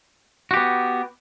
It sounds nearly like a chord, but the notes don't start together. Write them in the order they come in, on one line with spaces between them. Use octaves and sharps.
F#4 G4 B3